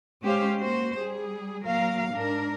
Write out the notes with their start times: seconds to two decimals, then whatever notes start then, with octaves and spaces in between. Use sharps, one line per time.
0.22 G#3 C#4 G4 C5 F5
0.60 A#3 F#4 C5
0.98 G3 G#4
1.65 F#3 A#3 A#4 F5
2.13 G#2 D4 A#4